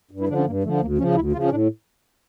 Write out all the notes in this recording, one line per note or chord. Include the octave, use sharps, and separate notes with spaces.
G2
E4
D3 F3 D4
C#4
G2 A#3
D3 F3 A3
D2 A#3
C#3 F3 C#4
D2 E4
C#3 F3 F4
C#4
A2 D4